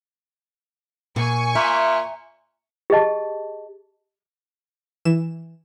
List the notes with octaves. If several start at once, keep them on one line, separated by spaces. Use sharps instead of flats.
A#2 G#5 C#6
A#2 E5
G4 G#4 D#5 A5
E3 E7